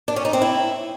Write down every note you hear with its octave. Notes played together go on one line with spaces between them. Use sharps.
D4
C#4
D#4
C4
E4